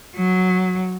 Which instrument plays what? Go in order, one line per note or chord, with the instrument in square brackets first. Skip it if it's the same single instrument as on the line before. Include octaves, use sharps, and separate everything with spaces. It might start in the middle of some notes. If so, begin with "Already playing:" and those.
[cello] F#3